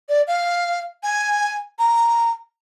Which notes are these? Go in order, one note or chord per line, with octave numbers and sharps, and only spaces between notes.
D5
F5
G#5
A#5